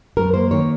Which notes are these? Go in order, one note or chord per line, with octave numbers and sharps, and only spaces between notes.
F#2 A#4
A#3 C5
D#3 C#5